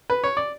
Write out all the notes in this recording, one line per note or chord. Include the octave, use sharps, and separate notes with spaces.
B4
C#5
D5